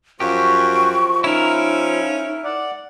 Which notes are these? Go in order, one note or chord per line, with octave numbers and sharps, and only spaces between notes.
F#2 F3 G4 C#6
C#4 D#4 E4 A#4
D5 F#5